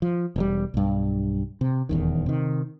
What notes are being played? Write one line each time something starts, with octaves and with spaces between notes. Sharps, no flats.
F3
E1 A#2 G3
B1 G2
C3
D#1 E2 D#3
C3 D#3